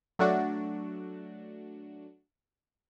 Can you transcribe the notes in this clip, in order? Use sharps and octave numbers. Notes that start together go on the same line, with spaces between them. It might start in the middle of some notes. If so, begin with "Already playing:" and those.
F#3 A3 D4 F#4